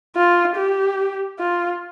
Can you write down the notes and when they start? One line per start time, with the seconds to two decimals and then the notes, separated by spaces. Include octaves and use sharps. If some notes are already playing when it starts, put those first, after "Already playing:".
0.16 F4
0.56 G4
1.39 F4